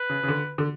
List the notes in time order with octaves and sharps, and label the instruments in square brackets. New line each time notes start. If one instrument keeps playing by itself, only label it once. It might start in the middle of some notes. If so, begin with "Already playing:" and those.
Already playing: [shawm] B4
[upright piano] C#3
C#3
D3
D3